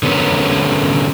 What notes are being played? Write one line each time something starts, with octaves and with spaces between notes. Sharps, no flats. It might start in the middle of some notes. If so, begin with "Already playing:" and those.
D3 B3 C#4 A#4